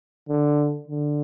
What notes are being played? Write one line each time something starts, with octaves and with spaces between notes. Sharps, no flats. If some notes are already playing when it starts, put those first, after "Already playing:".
D3
D3